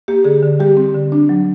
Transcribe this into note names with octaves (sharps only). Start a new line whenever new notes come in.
A#3 G4
D3 G#4
D3
G3 G4
C4
D3
D4
F#3